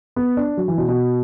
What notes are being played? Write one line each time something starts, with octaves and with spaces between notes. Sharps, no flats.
B3
D4
F#3
E3
B2
B2